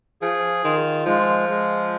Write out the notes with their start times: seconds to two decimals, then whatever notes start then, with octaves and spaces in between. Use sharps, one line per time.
0.22 F3 G#4
0.64 D#3 F4
1.06 F3 G#3
1.49 G#3